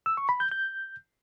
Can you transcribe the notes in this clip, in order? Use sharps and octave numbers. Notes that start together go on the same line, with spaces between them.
E6
C#6
B5
G6
G6